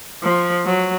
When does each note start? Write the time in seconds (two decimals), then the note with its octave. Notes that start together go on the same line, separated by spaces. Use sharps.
0.24 F3
0.65 F#3